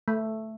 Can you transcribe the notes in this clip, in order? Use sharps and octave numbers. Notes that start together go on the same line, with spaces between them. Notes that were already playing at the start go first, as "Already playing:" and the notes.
A3